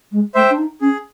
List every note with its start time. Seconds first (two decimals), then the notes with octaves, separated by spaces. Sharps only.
0.11 G#3
0.35 A3 C5 E5 G5
0.50 D4
0.58 D#4
0.80 C#4 G#4